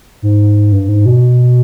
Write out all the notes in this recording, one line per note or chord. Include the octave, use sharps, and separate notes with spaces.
G#2
G2
G#2
B2